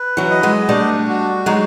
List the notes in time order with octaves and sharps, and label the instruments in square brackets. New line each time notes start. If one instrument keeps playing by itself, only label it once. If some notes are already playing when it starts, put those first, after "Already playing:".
Already playing: [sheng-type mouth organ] B4
[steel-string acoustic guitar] E3 F#3
[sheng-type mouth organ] D#5
[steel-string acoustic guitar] F#3 G#3
[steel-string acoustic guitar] G3 A3 [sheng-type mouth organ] D4
[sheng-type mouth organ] F#4
[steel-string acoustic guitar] F#3 G#3 [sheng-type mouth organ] D#4